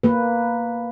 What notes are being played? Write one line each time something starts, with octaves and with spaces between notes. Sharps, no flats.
A#3 B4